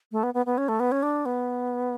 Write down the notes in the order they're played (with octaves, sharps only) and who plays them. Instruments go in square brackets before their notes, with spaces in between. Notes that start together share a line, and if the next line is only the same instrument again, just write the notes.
[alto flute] A3
B3
B3
B3
C#4
A3
B3
C#4
D4
B3